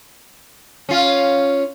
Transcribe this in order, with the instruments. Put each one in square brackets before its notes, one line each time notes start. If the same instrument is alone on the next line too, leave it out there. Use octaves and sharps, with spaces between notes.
[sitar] C#4 F4